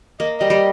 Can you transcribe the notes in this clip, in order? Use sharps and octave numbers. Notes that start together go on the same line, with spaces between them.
A#3 D#5
G3 D#5
G3